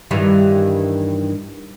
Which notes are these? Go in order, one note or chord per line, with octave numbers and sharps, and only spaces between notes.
G2 D#3 E3